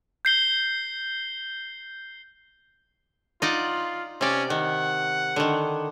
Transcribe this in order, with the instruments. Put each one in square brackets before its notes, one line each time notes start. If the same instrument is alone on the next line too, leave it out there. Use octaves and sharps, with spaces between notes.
[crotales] G6 C7 G7
[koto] D#4 D5 F#5 [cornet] F4
[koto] C3 D5 [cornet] C#4
[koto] D#3 [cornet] F#5
[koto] D3 D#3